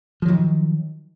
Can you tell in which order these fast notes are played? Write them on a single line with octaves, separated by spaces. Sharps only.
F3 F#3 D#3